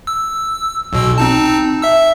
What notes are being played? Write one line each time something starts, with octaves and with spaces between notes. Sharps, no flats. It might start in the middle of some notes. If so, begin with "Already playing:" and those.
E6
B1 B2 E6
C4 D#4 A5
E5 E6